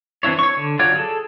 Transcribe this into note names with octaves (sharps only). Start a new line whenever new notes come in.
E3 C4 D4 E4 C#5
C#5 C#6
D3
F#3 F4 C#5 D5
G#4 A4